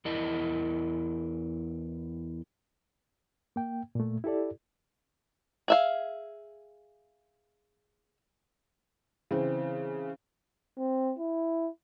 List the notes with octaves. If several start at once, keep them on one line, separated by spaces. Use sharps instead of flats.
E2 E4 A#4 D#5 A5
A#3 G5
A#2 A3
E4 G4 A4 D5
G#4 E5 F5
C#3 E3 C4
C4
E4